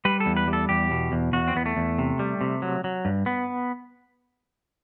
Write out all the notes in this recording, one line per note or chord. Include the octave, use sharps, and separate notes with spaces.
G3 B4
A4
E2
B4
G3
A4
E2 G4
B2
E2
E2 F#4
C4
E2 B3
A3
E2
C3
G3
C3
F#3
F#3
G2
B3